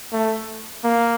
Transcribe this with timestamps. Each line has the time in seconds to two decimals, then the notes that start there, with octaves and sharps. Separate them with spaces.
0.13 A3
0.84 A#3